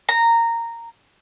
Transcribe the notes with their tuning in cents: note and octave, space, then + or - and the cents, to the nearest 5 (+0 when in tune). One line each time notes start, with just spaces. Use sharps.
A#5 -10